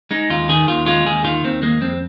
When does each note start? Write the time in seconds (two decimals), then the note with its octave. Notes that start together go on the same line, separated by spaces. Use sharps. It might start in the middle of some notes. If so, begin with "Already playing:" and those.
0.11 G#3 D#4
0.30 D#2 F4
0.49 D#3 G#4
0.67 D#2 F4
0.86 G#3 F4
1.06 D#2 G#4
1.24 D#3 F4
1.44 D#2 C4
1.62 G#3 A#3
1.81 F2 C4